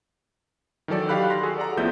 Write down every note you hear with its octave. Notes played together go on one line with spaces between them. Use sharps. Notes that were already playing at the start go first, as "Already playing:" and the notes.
D#3 E3 F#3 A4 D5
F#4 G4 F5 B5 F#6
C6 F#6 A#6
F#4 G#4 A4
A4 D5 F#5 A#5
A1 A2 F3 B3 E5 G6